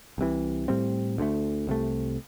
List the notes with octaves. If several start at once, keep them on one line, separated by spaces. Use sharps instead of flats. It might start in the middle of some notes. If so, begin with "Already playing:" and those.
C2 C3 E3
A2 G3 C4
D2 D3 A3
C2 C3 A3